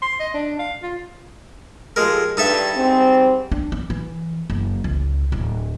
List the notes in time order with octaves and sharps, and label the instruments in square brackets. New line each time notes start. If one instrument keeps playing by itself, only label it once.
[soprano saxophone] C6
D#5
D4
F5
F4
[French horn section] F3 G4 A4 [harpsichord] G#3 A#4
[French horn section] G2 [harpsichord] D#4 A4 E5
[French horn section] G#2 G3 C4
[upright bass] D4
C4
E3
F#1
C#2
D1